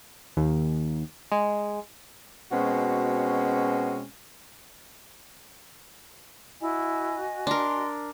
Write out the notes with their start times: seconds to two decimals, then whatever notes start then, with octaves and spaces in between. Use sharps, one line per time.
0.37 D#2
1.32 G#3
2.52 B2 G#3 C4 C#4 F#4
6.61 E4 F#4 D#5 G#5
7.47 D4 A#4 C6